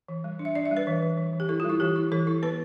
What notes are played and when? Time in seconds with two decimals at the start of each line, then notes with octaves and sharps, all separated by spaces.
0.08 E3
0.24 G3
0.39 D4
0.45 E5
0.55 D4 D5
0.66 E5
0.71 G3
0.77 B4
0.87 E3
1.02 E3
1.17 E3
1.33 E3
1.40 G4
1.49 E4 A4
1.60 F4
1.65 G3 E4
1.80 E3 G4
1.96 E4
2.12 E3 A4
2.27 E4
2.42 B3 B4